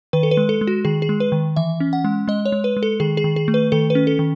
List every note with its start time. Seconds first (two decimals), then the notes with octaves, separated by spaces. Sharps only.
0.13 D#3 B4
0.23 A4
0.31 B4
0.37 G#3
0.49 A4
0.61 G#3
0.67 F#4
0.85 D#3 G#4
1.02 G#4
1.09 G#3
1.20 B4
1.32 D#3
1.56 E3 E5
1.80 C#4
1.93 F#5
2.04 G#3
2.28 G#3 D#5
2.46 C#5
2.52 G#3
2.64 B4
2.77 G#3
2.83 A4
3.00 D#3 G#4
3.17 G#4
3.24 D#3
3.36 G#4
3.48 A3
3.54 B4
3.72 D#3 A4
3.90 B4
3.95 C#4
4.07 A4
4.19 D#3